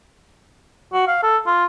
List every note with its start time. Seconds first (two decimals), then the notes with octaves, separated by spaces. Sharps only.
0.93 F#4
1.08 F5
1.23 A4
1.47 F4